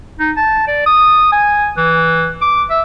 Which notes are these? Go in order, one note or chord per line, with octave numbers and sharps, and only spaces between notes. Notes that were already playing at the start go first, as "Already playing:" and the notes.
D#4
A5
D5
D#6
G#5
E3
D6
E5